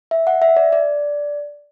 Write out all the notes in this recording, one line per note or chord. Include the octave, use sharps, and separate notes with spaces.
E5
F#5
E5
D5
D5